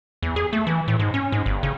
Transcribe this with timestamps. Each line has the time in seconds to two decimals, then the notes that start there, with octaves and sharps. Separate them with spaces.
0.23 E2
0.36 G#4
0.53 A3
0.67 E3
0.88 A2
0.99 G#2
1.14 C#4
1.32 G#2
1.46 G1
1.63 C#3